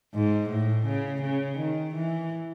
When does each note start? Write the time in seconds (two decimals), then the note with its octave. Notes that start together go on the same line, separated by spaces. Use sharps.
0.14 G#2
0.50 A2
0.86 C#3
1.22 C#3
1.58 D#3
1.95 E3